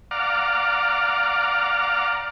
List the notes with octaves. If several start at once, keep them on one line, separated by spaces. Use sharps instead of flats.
D5 F5 F#5 A#5 D6 F6